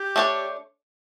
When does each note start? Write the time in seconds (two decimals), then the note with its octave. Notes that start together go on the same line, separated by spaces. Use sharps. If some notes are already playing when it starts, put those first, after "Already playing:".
Already playing: G4
0.16 A3 D4 A4 C#5